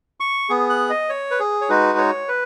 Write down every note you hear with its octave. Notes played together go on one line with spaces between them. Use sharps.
C#6
B3 G#4
F#6
D#5
C#5
B4
G#4
C#5
G#3 D#4 F#4 B4
C#5
B4